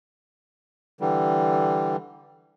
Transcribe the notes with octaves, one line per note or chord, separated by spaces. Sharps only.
D3 E3 G3